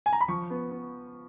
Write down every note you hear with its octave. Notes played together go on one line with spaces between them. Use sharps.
G#5
A#5
B5
F3 C#6
B3
B3